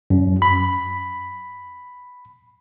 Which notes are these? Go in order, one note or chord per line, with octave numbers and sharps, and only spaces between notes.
F#2
B5